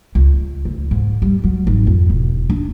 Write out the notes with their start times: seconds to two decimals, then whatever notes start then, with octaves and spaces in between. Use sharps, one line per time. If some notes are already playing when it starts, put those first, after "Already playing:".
0.15 C#2
0.65 D2
0.91 G#2
1.22 G3
1.44 F#3
1.67 G#1
1.87 F2
2.10 E1
2.50 D4